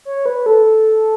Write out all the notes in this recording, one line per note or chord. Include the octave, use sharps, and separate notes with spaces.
C#5
B4
A4